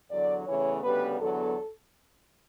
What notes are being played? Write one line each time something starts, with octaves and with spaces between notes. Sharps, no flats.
E2 D3 F#3 D5
E2 C#3 E3 A3 C#5
D2 C#3 G3 B3 B4
E2 D3 F#3 B3 A4